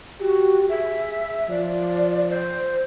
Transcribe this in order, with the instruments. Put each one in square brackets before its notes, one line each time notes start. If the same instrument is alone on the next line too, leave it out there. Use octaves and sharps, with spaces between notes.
[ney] F#4 [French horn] G4
[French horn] G#4 [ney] E5
[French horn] F3 [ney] D5
[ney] C5